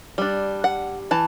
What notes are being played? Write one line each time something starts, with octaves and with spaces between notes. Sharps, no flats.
G3 D4
F#5
E3 A5